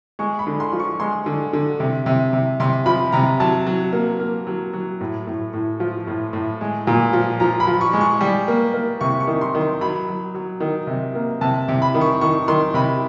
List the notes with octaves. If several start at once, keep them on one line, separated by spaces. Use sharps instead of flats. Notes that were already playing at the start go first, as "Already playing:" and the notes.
G#3 C#6
B5
D3
C6
F3
C#6
G#3 C6
D3
D3
C3
C3
C3
C3 C6
F3 B5
C3 A#5
F#3 A5
F#3
A#3
A#3
F#3
F#3
A2
A2
A2
F3
A2
A2
G#3
A#2
F3
F3 A#5
B5
F3
C#6
G#3
C#6
G3
A#3
A#3
C3 C#6
C#6
D#3
C6
D#3
C6
F#3 B5
F#3
F#3
D#3
C3
A#3
C3 A5
C3
B5
D#3
C#6
D#3 C#6
D#3 C6
C3 B5